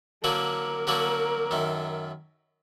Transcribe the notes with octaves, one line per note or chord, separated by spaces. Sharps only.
D3 F#3 A#3 D4 F#4 A#4
D3 F#3 A#3 D4 F#4
F#2 D#3 A3